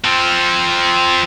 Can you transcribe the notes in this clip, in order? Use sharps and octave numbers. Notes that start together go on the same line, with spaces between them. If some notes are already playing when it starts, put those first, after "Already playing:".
F3 C4